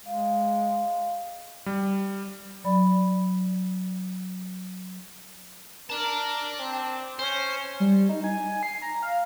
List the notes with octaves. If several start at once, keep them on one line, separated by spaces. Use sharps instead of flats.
G#3 F5
G3
F#3 D5 B5
A#4 D5 A5
C4
C#4 C5
G3
D#4
G#5
C7
A#5
F5